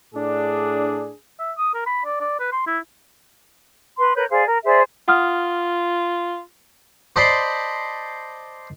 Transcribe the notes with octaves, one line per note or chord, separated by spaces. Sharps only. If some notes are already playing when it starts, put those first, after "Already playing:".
A2 D4 G#4
E5
D#6
A#4
B5
D5
D5
B4
C6
E4
B4 C6
A#4 B4 C#5 G6
G#4 C5 D5 F5
A#4
G#4 C5 D5 E5
F4 F#5 D#6 F6
C5 D5 D#5 A5 B5 C6